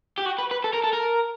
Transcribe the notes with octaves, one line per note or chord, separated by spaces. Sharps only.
G4
F#4
B4
B4
A4
A#4
A4
A#4